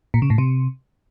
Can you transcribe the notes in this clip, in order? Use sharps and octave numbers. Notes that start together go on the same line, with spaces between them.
A#2
C#3
A2
C3